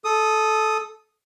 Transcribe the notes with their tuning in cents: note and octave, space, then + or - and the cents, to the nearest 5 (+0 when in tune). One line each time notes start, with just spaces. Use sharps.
A4 -15 D#6 +0